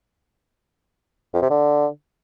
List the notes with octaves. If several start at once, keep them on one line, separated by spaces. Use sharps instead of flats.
F2
C3
D3